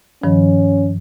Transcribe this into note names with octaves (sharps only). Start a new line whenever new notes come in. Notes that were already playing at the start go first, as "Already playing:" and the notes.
G2 D#3 F3 C#4